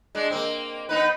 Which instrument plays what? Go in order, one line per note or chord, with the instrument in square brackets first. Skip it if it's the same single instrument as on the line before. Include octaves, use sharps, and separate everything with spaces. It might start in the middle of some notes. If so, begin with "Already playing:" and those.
[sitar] G#3 D4
A#3 C4
B3 D#4 B4